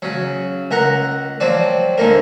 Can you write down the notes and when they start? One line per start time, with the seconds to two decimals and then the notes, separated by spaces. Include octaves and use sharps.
0.02 C#3 F#3
0.71 C#2 A#4 F#5 A#5
1.40 F3 F#3 C4 D5
1.98 G#2 D3 A#3 A#4